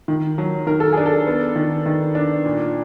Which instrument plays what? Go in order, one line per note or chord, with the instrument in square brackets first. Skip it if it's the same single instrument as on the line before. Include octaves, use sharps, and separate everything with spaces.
[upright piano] D#3
F#3
D#3 A#4
A4
D4 G#4
A4
B3
D#3
D#3
D4
A#2